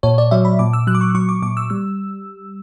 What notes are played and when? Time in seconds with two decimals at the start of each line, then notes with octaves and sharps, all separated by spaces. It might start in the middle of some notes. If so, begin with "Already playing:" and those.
0.03 A#2 C#5
0.18 D5
0.31 F#3 E5
0.45 B5
0.59 A#2 D6
0.73 E6
0.87 F#3 F#6
0.95 D6
1.01 C#6
1.15 F#3 C#6
1.29 D6
1.42 A#2 D6
1.57 E6
1.70 G3 E6